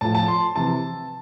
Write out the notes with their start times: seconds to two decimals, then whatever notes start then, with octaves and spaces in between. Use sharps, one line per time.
0.01 A2 F3 A5
0.15 A5
0.28 C6
0.55 C3 E3 A5